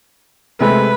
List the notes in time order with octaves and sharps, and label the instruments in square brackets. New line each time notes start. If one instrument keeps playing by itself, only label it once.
[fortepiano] C3 G#3 A3 [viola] B4